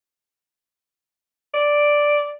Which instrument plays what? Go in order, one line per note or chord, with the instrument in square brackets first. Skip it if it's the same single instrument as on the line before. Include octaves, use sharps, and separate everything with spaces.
[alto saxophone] D5